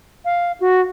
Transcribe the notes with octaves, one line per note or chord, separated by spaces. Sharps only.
F5
F#4